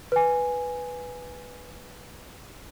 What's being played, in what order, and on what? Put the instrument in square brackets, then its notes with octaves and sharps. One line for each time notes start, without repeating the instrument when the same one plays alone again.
[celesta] B4 G#5